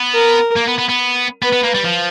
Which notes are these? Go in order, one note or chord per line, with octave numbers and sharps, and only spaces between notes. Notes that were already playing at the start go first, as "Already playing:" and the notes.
Already playing: B3
A#4
A#3
B3
B3
B3
B3 B4
B3
A#3
G3
F3